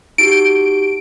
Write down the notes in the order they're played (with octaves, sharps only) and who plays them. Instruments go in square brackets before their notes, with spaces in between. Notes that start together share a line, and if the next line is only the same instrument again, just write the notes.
[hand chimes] D#4 F#4 G4 [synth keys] D7